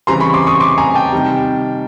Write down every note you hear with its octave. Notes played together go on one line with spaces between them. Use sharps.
C#3 E3 G3 C4 A#5 C6
B5 C#6
C6 D6
C#6 D#6
C6 D6
G#5 A#5
G5 A5
C3 D#3 G3